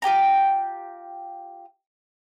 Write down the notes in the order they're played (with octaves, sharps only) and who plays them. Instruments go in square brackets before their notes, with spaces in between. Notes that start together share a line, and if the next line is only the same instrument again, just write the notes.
[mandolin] F4 G4 G5 A#5